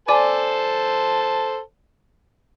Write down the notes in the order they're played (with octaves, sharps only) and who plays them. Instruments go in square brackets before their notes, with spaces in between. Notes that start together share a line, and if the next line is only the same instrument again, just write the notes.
[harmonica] A4 C5 A5 [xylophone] D5 G#5 D6